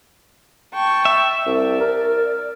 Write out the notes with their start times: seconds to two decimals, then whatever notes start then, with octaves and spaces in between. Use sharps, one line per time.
0.74 G5 A5 C#6
1.05 E5
1.46 C2 D5
1.80 A#4